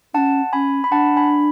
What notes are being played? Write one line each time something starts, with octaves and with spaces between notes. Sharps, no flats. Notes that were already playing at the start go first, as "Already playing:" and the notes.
C#4 D4 F#5 A5
C#4 G#5 B5
B5
D4 F#5 A5
G#5 B5